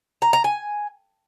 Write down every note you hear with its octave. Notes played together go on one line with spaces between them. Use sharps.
A#5
A#5
G#5